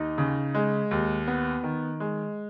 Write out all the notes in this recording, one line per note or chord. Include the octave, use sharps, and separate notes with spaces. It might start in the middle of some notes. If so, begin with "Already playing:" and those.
Already playing: D#2 D#4
C#3
G#3
D#2
B3
D#3
G#3